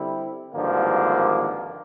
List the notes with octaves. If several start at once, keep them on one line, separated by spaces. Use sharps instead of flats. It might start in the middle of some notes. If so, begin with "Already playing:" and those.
Already playing: D3 G3 C4 E4
G#1 G2 D3 F3 A#3